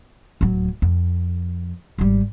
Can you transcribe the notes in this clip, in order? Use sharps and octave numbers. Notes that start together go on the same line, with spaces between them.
D1 F#3
F2
G#1 G3